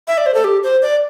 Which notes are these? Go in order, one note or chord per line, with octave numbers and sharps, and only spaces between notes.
E5
D5
C5
A4
G4
C5
D5